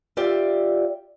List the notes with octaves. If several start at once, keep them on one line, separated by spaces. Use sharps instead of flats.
F4 G4 D5 E5